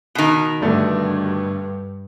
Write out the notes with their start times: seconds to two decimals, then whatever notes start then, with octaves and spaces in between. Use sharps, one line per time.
0.15 B2 D#3
0.62 G2 D3 A3 D4